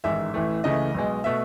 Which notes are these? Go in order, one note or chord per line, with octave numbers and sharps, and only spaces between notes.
A1 G#2 D#3 G#3 E5
A1 A2 E3 A3
C#2 C#3 E3 A3 D#5
B1 B2 G#3
B2 A3 E5